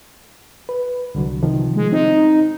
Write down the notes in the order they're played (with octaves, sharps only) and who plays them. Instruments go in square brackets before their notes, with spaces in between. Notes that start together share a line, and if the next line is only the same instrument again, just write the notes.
[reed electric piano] B4
C2 D3 F#3
C3 D#3 F3
[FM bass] G#3
[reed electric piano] C4 [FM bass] D#4